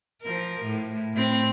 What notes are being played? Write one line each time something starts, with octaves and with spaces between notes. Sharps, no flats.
F3 A#4
A2
A2 C4